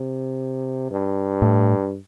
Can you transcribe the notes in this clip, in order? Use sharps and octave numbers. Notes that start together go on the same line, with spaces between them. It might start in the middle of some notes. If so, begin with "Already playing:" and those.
Already playing: C3
G2
A2